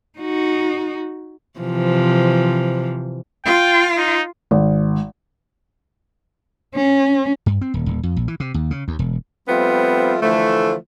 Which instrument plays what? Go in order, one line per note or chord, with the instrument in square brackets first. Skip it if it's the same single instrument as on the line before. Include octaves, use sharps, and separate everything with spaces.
[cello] D#4 F#4
[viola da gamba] C3 E3 F3
[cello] F4 [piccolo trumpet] G5
[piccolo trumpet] D#4
[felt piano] G#1
[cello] C#4
[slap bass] G2
C4
D#1
D#1
F2
A#1
E3
C3
D#2
C#3
D#2
E1
[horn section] F3 G3 A3 B3 C4 F4
D3 E3 F3 A3